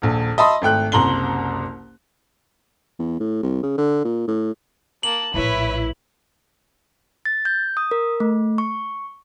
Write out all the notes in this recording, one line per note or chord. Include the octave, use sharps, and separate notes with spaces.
D#1 A#1
D#5 E5 A5 B5 C6 D#6
G#1 A3 G5 F#6
F#1 C2 A#5 C6 F#7 G7
E2
A2
C2
C#3
D3
A#2
A2
A#3 A5 F#7
A#1 A2 E4 B4 C#5
A6
G6
D#6
A#4
A3
C#6